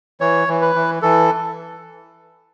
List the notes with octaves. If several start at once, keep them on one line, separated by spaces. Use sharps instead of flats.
E3 C#5
E3
B4
E3
E3 A4